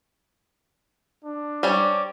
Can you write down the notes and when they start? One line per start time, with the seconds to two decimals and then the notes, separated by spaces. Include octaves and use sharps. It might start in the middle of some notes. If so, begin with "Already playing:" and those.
1.25 D4
1.63 G3 C#4 G4 C5 D5 D6